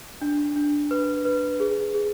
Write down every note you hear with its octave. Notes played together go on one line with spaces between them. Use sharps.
D4
D4
B4
B4
G#4
G#4